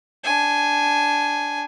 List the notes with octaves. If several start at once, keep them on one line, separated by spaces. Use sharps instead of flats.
D4 G#5